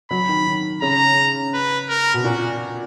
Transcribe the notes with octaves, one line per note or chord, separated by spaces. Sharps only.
F#3 B5
D#3
D#3
C#3 A#5
B4
A#4
B2
A#2 F#4